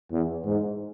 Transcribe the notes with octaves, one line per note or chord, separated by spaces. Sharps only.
E2
G#2